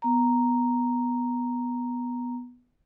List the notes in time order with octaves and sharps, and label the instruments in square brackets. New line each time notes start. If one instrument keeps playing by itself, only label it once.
[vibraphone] B3 A#5